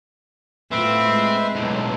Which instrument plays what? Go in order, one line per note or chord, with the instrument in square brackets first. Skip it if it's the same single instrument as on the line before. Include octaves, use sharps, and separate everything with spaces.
[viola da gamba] A2 F4 [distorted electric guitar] C4 [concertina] B4 E5
[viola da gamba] G#3
[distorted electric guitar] B1 A2